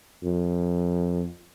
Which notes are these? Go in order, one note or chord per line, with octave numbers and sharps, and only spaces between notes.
F2